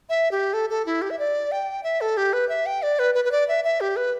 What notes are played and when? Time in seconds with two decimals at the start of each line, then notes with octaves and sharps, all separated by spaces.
0.09 E5
0.32 G4
0.53 A4
0.70 A4
0.86 E4
1.02 G4
1.10 E5
1.19 D5
1.52 G5
1.83 E5
2.01 A4
2.17 G4
2.33 B4
2.49 E5
2.66 G5
2.82 D5
2.99 B4
3.15 B4
3.25 B4
3.32 D5
3.48 E5
3.65 E5
3.81 G4
3.96 B4